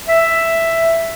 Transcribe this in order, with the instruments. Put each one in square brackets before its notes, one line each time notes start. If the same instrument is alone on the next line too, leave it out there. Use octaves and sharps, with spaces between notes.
[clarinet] E5